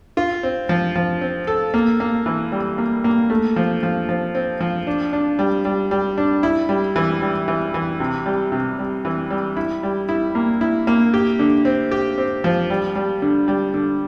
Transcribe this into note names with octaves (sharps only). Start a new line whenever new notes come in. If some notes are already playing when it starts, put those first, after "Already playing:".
F4
C4
F3
F3
C4
A4
A#3
A#3
E3
G3
A#3
A#3
A3
F3
F3
F3
C4
F3
D4
D4
G3
G3
G3
D4
E4
G3
E3
G3
E3
E3
C3
G3
C3
G3
E3
G3
E4
G3
E4
A#3
E4
A#3
G4
D3
C4
G4
C4
F3
G3
G3
D3
G3
D3